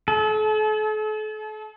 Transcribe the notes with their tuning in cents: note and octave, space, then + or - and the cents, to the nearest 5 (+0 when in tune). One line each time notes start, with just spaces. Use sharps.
A4 -40